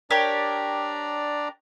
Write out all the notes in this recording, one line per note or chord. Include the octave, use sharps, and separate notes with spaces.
D4 G4 A#4 C#5 D5 A#5